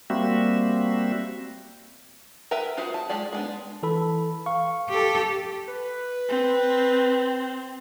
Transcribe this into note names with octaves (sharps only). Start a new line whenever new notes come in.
G3 A#3 C4 F#4 E5
A#4 B4 E5 G5 A#5
F4 F#4 G#4 C5 E5
A5
G#3 G4 G#4 D5
G#3 B3 D4
E3 A4 B5
F5 C#6
G4 A4
B4
C4